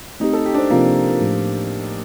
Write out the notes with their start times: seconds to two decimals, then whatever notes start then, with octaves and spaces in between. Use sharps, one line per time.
0.20 A3 C4 D#4 G4
0.33 A4
0.46 G4
0.54 D4
0.58 C4
0.70 C3 F3 A#3 C4 F4 A#4
1.21 A2 F3 A3